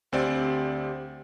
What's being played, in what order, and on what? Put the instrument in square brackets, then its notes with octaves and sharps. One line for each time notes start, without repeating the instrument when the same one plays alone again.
[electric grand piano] D2 C4 D5 [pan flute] G4